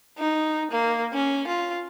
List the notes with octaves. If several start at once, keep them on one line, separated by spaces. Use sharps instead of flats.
D#4
A#3
C#4
F4